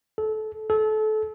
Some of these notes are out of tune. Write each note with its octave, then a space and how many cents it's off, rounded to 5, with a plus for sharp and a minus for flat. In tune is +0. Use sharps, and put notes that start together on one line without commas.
A4 -25
A4 -30